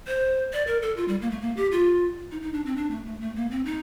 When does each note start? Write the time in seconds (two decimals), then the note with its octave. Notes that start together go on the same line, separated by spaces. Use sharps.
0.07 C5
0.53 D5
0.67 A#4
0.82 A4
0.97 F4
1.08 G3
1.22 A#3
1.31 A3
1.42 A#3
1.57 G4
1.72 F4
2.31 D#4
2.42 D#4
2.54 D4
2.66 C4
2.76 D4
2.91 A3
3.06 A3
3.21 A3
3.36 A#3
3.51 C4
3.66 D#4